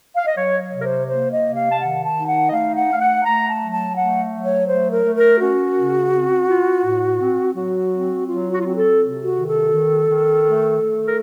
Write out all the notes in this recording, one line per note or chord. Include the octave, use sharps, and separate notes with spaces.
F5
D#5
F#3 C#5
C#5
C3
A#4
C5
A#3 C5
D#5
C3
F5
A5
D#3 F#5
A5
D#4
F#5
D#5
A3 F5
F#5
A3 F5
F#5
A3 A#5
A5
F#3
A5
A3 F#5
F#3
C#5
A3 C5
A#4
A3
A#4
C#4 F#4
C#3
C4
F4
A2
C4
F#3 F#4
C4
F#3 F4
F#4
F4
C4 F#4
A4
C3
F#4
D#3
A4
D#3
D#3
A3
A3
A#4